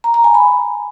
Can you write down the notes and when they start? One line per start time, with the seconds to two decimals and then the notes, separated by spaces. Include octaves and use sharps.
0.04 A#5
0.14 A#5
0.24 G#5
0.34 B5